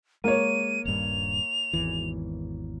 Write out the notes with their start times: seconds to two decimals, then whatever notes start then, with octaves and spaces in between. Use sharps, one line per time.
0.24 G#3 A#3 C#5 D#7
0.85 D#1 G2 F7
1.73 G#1 E2 E3